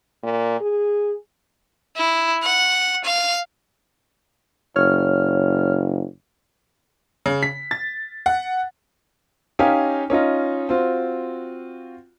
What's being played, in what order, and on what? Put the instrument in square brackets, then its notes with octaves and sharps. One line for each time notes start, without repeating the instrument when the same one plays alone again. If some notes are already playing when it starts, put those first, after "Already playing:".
[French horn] A#2
G#4
[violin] E4
F#5
F5
[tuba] F#1 [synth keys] C#5 F6
[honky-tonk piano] C#3
B6
A6
F#5
[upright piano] C#4 D#4 G4 F5 G#5
C#4 D#4 F4 D#5
C4 F4 F#4